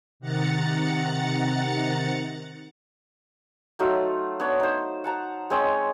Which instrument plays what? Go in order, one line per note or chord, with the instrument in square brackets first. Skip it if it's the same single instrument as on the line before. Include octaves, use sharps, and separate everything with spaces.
[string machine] C3 D#3 F#5 A#5 A6 C#7
[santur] F#3 A3 D#4 F4
B3 D4 C#5
D#4 C5
F#5 A5 A#5
G#3 C4 C#5 D#5